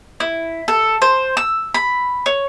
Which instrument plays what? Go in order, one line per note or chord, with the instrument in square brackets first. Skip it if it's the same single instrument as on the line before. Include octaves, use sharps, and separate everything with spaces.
[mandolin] E4
A4
C5
E6
B5
C#5